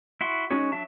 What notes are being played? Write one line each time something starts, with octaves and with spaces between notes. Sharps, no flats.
E4 F#4 C6
G#3 C#4 D#4 F#4 C#5
F#3 D4 F#4 E5 A5